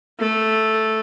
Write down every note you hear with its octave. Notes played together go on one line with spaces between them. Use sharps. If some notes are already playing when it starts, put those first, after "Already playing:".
A3